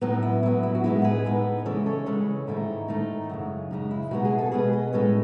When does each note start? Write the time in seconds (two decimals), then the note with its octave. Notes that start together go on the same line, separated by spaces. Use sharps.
0.01 A2 F#3 B3 D#4
0.23 E4
0.43 A2 F#3 B3 E4
0.63 E4
0.75 F#4
0.84 A2 G#3 B3 D#4 E4
1.04 G#4 B4
1.25 A2 G#3 B3 D#4
1.66 C#3 E3 G#3 C#4 A4 C#5
1.86 A4 C#5
2.06 C#3 E3 G#3 C#4
2.47 G#2 D#3 A3 D#4 E4
2.88 G#2 D#3 A3 D#4
3.29 F#2 C#3 G#3
3.71 F#2 C#3 G#3 D#4
3.91 E4
4.11 B2 G#3 B3 D#4 F#4
4.25 E4 G#4
4.38 F#4 A4
4.52 B2 G#3 B3 G#4 B4
4.73 B4 D#5
4.92 A2 G#3 C#4 A4 C#5